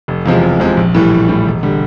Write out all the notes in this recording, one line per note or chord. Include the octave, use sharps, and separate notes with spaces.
F1
E2 C3 F3 G#3
F1
E2 C3 F3 G#3
A#1
A2 E3 G3
A#1
A2 E3 G3
E1
D3 G3